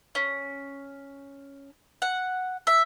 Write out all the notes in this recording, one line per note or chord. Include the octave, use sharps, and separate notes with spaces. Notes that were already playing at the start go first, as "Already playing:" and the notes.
C#4
F#5
E5